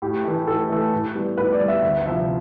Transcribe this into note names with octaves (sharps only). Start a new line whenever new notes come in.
A2 G4
E3 A3
A2 A4
E3 A3
A2
G3 B3
A2 B4
D5
G3 B3
E5
D2 E5
C3 F3 C4 E4 E5